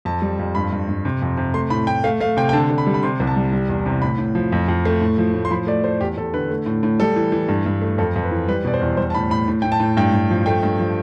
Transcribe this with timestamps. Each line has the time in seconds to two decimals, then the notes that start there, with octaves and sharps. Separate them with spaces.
0.05 F2 A5
0.22 G3
0.39 F2
0.55 G2 B5
0.72 G2
0.89 G2
1.05 C3
1.22 F2
1.37 C3
1.54 A3 C6
1.70 A2 B5
1.87 A2 G5
2.04 A3 F5
2.20 A3 F5
2.37 C3 G5
2.49 G5
2.53 D3 A5
2.71 D3
2.78 B5
2.87 G3
2.94 B5
3.03 C3 C6
3.20 C2
3.27 A5
3.36 G3
3.52 G3
3.69 E2
3.86 C3
4.02 A2 B5
4.18 A2
4.35 F3
4.52 F2
4.68 F2
4.85 A3
5.01 A2
5.18 F3
5.34 A2
5.45 C6
5.51 F3 B5
5.67 A3 D5
5.84 A3 C5
6.01 E2 G4
6.17 E2 A4
6.33 D3 B4
6.51 A3
6.66 A2
6.83 A2
7.00 G3 A4
7.16 E3
7.32 E3
7.49 G2
7.66 G2
7.82 A3
7.98 F2 A4
8.16 F2
8.23 B4
8.31 E3
8.48 G3 B4
8.65 B2 D5
8.74 C5
8.81 E2
8.97 G3 C5
9.10 A5
9.14 A2 B5
9.30 A2 B5
9.48 A2
9.62 A2 G5
9.72 A5
9.80 A2
9.97 G2 G5
10.13 G2
10.31 F3
10.46 A3 G5
10.63 G2
10.79 F3